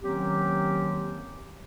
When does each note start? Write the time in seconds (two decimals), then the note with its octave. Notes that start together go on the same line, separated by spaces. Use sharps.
0.03 D#3 F#3 A#3 C4 C#4 G4